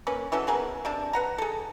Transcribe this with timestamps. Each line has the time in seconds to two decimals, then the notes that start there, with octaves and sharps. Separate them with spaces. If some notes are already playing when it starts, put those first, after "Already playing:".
0.07 A#3 C#4 B4
0.32 E3 F#3 C#4 A4
0.47 B3 G#4 A#4 B4
0.85 C3 D4 A5
1.13 B4 F#5 A#5
1.38 G#4 A4